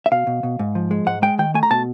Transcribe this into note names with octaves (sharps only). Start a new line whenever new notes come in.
E5
B2 F5
B2
B2
G#2
F3
G#3
G#2 F#5
G#3 G5
D#3 G5
A3 G#5
A#5
B2 A5